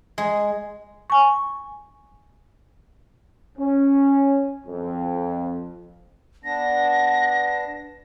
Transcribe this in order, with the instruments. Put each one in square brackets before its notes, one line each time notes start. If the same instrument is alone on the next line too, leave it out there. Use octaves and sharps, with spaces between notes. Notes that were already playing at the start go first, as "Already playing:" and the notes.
[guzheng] G#3
[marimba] G#5 C#6
[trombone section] C#4
F2
[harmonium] B3 D4 [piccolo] A#6